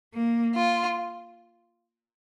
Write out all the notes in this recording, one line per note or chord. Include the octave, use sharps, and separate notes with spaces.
A#3
F4